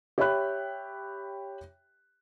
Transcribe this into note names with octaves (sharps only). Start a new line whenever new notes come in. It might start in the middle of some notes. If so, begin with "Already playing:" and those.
G4 C#5 E5 G5 B5 F#6